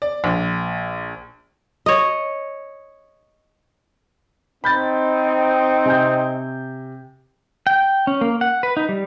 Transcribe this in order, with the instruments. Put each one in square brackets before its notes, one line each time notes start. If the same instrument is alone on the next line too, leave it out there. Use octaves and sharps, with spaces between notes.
[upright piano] D5
A#1
[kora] C#5 D#5
[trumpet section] C4 D#4 [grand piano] B5 G6 A6
[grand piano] C3 G#5 G6
[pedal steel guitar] G5
C#4
A#3
F#5
B4
D#4
G3